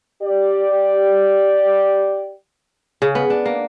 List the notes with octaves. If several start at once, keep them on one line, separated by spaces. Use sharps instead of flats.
G4 D5
C#3
B3
D4
A#3